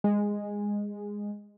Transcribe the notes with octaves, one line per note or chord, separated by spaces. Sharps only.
G#3